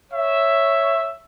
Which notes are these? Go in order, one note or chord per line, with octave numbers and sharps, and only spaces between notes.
C#5 E5